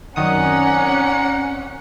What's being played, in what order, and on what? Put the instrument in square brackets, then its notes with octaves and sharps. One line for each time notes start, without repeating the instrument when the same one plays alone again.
[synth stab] F#2 D#3 D#6 [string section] C4 C#4 [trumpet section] D5 A#5 [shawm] F#5